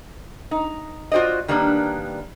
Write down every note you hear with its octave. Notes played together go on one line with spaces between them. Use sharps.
D#4
F4 F#4 C5 D5 D#5
D#3 G3 A#3 B3 D4